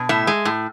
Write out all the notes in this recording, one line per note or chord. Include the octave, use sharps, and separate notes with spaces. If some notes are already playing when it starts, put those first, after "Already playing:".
Already playing: B2
A2 E5
G#3
A2